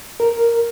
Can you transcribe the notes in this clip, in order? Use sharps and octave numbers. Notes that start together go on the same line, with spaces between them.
A#4